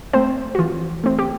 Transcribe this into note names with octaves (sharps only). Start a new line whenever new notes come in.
A3 C4 C5
F#4
E3 F4
A3 C4
G4